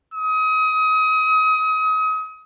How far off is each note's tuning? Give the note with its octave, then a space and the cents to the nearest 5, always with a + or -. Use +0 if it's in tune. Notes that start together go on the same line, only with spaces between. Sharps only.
D#6 +30